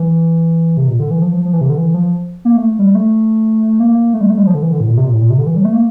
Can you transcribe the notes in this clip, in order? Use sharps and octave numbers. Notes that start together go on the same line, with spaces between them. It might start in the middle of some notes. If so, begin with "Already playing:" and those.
Already playing: E3
C3
A#2
D3
E3
F3
F3
F3
E3
C3
D3
E3
F3
A#3
A3
G3
A3
A#3
A3
G3
A3
G3
F3
D3
E3
D3
A2
A#2
C3
A#2
A2
A#2
C3
D3
E3
G3
A3
A#3